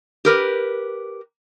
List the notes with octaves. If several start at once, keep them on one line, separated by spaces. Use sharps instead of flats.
G4 A#4 B4